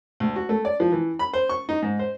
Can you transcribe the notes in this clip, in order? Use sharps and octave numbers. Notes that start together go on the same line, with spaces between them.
D2
F#4
A3
D5
F3
E3
B5
C5
C#6
D#4
G#2
C5